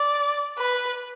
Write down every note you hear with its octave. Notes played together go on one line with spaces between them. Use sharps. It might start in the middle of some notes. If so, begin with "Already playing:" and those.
Already playing: D5
B4